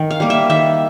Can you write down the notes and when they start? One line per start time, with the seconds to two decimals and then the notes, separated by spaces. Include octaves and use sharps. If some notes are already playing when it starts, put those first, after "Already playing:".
Already playing: D#3
0.10 F5
0.20 G3 A#3
0.30 E5
0.50 D#3 E5